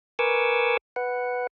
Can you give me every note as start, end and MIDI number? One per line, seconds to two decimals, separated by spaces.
0.19 0.77 70
0.19 0.77 71
0.19 0.77 80
0.19 0.77 85
0.19 0.77 86
0.19 0.77 88
0.96 1.47 71
0.96 1.47 78